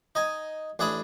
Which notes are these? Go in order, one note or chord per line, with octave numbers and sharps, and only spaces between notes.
D#4 D#5 G#5
A1 D4 G#4 E5 B5 D#6